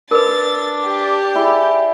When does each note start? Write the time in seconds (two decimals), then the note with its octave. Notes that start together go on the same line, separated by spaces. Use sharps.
0.11 D4 A#4 B4 A6
0.85 G4
1.35 E4 G#4 D5